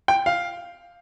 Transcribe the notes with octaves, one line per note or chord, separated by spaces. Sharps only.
G5
F5